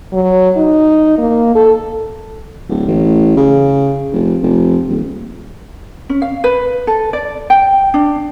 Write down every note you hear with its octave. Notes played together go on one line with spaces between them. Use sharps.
F#3
D#4
A#3
A4
D1
A1
C#3
F1
F1
D#1
C#4
F5
B4
A4
D5
G5
D4